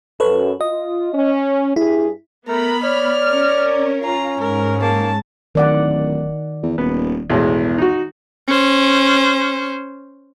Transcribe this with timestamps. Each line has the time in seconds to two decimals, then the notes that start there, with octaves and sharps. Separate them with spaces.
0.20 F#2 A4 B4 C#5
0.61 F4 D#5
1.13 C#4
1.76 G2 G3 E4 G#4
2.48 A3 B3 A#4 A#5 B5
2.84 C#5 D5 F6
3.28 C#4 A#4
4.04 C#4 F4 A#5
4.41 G#2 A#4
4.82 A#3 A5
5.55 D1 D#3 D5 F#5
6.63 E2
6.78 D#1 B3
7.30 B1 E2 A2 G#3
7.78 D#4 F#4
8.48 C#4 C5